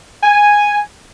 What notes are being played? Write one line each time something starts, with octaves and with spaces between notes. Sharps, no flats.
G#5